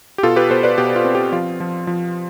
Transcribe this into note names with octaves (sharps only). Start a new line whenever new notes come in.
G4
B2 F4 A4
G4 B4
B2 A4 C5
B4 D5
B2 G4
F4
C4
G4
F3 F4
F3
F3